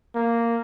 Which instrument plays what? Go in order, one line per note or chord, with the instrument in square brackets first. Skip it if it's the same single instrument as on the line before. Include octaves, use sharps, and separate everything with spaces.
[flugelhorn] A#3